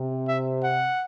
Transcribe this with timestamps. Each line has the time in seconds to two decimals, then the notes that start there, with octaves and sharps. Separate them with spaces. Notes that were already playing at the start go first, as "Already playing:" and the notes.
Already playing: C3
0.28 E5
0.64 F#5